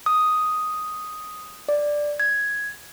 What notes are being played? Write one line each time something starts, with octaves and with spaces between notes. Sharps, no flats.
D#6
D5
G#6